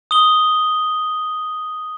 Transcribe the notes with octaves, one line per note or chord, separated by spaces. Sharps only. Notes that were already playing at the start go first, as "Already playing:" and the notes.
D#6 G7